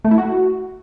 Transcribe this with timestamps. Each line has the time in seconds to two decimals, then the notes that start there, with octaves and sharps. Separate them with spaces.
0.05 A3
0.11 E4
0.18 F#4